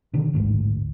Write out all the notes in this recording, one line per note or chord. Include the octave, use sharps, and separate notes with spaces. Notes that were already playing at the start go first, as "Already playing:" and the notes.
B2 D3 D#3
E1 A1 D2 G#2